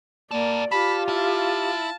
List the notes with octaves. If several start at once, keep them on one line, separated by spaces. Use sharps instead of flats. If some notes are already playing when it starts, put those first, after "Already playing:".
A#3 G4 A4 D5
F4 G4 A4 B5
E4 A5